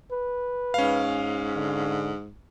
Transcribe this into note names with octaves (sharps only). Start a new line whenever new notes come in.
B4
G#2 C#4 F5
D3